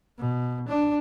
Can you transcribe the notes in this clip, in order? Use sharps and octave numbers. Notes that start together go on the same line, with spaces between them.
B2
D4